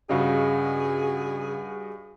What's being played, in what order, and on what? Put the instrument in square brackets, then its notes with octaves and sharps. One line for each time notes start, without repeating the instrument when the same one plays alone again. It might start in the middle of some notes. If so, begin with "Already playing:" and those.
[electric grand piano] G2 F#4 D#5 [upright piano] C#3 F5 [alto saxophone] G#4